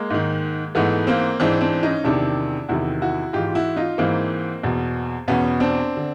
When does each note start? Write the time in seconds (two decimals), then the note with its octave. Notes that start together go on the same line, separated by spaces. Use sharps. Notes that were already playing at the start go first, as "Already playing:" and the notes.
Already playing: G#3 A#3
0.10 G#2 D#3
0.75 G#2 E3 A3 B3
1.07 A#3 C4
1.40 G#2 E3 C4 D4
1.61 C4 D4
1.83 C#4 D#4
2.04 E2 C3 D#3 D4 E4
2.69 E2 C3 D#3 E4 F#4
3.02 E4 F#4
3.33 G#2 E3 F4 G4
3.47 F4
3.55 E4 F#4
3.77 D#4 F4
3.98 G#2 E3 A#3 C4
4.63 E2 B2
5.28 E2 B2 B3 C#4
5.60 C4 D4
5.97 D3